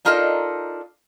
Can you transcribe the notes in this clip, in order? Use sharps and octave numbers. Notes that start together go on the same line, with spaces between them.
D4 D#4 F4 A4 A#4 D#5